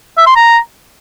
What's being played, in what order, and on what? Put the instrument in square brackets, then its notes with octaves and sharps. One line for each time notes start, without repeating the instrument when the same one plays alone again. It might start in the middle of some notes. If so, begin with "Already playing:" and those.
[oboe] E5
C6
A#5